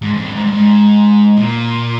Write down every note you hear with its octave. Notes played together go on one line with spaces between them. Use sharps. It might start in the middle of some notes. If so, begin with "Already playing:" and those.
G#2
F2
G2
G#2
G2
G#2
A#2